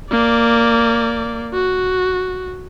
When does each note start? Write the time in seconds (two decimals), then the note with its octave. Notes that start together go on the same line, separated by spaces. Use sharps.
0.11 A#3 D5
1.54 F#4